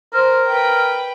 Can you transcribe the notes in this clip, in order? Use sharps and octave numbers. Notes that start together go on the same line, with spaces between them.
A#4 C5
B4 G5